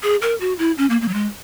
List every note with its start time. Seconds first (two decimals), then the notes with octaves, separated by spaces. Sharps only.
0.03 G#4
0.22 A#4
0.41 F#4
0.59 E4
0.78 C#4
0.90 A#3
1.01 A#3
1.08 F#3
1.14 G#3